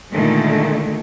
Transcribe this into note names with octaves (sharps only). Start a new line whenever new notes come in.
A#2 D3 D#3 G#3 A3